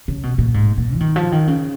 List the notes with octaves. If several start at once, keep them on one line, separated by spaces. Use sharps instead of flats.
C#3
B2
A#2
G#2
A#2
F3
D#3
F3
D#3
C#3